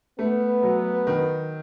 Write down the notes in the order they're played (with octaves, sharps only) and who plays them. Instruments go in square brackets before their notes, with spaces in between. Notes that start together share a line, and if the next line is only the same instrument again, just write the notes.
[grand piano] A3 [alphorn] B3
[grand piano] F#3
D#3